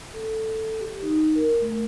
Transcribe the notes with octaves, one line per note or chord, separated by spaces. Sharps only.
A4
G4
D#4
A#4
A3